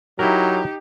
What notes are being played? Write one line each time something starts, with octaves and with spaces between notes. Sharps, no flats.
F#3 D#4 E4 G4 A#4